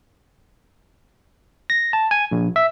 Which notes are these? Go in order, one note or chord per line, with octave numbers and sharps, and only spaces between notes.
A#6
A5
G#5
A#1
E5